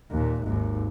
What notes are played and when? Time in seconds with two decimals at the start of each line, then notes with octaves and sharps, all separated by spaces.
0.11 D#2 A#2
0.44 G#1 D#2